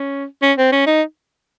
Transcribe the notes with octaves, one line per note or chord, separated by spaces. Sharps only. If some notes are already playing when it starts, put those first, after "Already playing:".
Already playing: C#4
C#4
C4
C#4
D#4